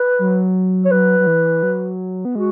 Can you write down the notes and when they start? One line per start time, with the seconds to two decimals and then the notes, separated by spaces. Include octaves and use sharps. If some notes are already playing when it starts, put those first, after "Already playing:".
Already playing: B4
0.19 F#3
0.85 C#5
0.91 F#3 B4
1.19 F#3
1.27 E3
1.63 F#3
2.25 B3
2.35 G#3 F#4